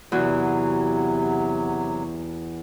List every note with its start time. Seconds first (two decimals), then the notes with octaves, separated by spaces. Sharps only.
0.12 E2 C3 F#3 F#4